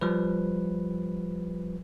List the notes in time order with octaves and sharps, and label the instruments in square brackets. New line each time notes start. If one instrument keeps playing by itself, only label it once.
[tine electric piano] F3 G3 B4